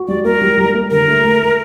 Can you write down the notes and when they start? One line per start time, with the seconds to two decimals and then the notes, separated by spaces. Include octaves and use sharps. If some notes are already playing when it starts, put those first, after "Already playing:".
Already playing: F#4
0.08 G3 D5
0.24 A#3 A#4
0.42 G3
0.58 G3
0.74 A#3
0.91 D3 A#4
1.08 A3
1.24 A3
1.41 A3